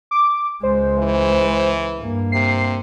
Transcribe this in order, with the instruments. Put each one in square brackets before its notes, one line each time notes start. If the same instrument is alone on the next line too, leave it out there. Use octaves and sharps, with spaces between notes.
[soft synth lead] D6
[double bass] C#2 G#3 [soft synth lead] C5
[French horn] E3
[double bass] G2 A#3
[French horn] C3 [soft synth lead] C7